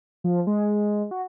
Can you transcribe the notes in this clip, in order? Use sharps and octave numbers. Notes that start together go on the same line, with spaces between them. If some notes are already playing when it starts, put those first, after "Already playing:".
F3
G#3
F#4